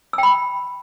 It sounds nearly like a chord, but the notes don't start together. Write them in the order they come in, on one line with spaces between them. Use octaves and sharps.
E6 G5 B5